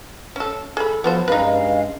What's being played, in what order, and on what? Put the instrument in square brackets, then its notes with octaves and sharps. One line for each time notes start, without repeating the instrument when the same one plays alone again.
[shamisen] C#4 A4
[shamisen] G#4 B5 [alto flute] A4
[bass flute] F3 [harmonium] F#3 [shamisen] B3 A4 C5 [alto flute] F4
[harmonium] G2 G#3 [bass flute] C#4 [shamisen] D#4 B4 [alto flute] F5